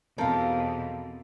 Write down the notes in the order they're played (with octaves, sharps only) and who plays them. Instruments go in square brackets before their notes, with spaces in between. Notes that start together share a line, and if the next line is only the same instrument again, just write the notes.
[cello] E2 B2 [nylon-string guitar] F3 F5 [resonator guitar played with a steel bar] C4 A4 A#4